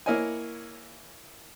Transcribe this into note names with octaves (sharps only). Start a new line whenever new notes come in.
A#3 E4 A#4 C#5 D#5 G#5